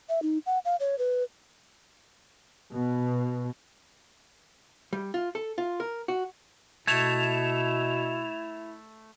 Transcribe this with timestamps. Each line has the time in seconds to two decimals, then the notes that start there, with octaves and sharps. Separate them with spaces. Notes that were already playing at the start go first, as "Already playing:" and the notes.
0.09 E5
0.22 D#4
0.46 F#5
0.65 F5
0.80 C#5
0.99 B4
2.73 B2
4.93 G3
5.14 F4
5.35 A4
5.58 F4
5.80 A#4
6.08 F#4
6.87 B2 A3 E4 G#6 E7 F7